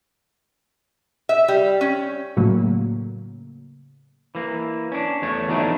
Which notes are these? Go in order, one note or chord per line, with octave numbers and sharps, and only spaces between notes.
E5
G3
C#4
A2 C#3 F#3 A#3
E3 A#3
C#4 D4
E2 A3 C#5
E3 F#3 A3 B3 D4 D#4